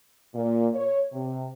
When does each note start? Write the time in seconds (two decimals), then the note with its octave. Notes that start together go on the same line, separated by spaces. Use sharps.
0.34 A#2
0.74 C#5
1.13 C3